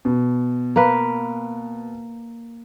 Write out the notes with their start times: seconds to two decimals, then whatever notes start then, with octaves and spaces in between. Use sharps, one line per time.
0.05 B2
0.76 A#3 B4